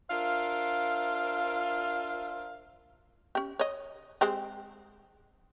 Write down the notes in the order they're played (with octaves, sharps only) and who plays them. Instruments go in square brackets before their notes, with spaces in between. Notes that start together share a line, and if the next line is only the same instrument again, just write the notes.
[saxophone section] D4 F4 A#4 C5 E5 F5
[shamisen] C#4 G4
C#5 D#5
G#3 C4 G4